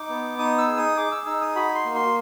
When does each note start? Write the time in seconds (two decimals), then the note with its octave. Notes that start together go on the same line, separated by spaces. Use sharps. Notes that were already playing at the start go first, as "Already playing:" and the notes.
Already playing: D#4 D6
0.09 B3
0.39 D#4 D#6
0.58 E6
0.68 G#4
0.77 D#6
0.97 G#4 D6
1.12 E6
1.26 D#4 E6
1.41 D#6
1.55 F#4 B5
1.75 C6
1.85 A#3
1.95 C6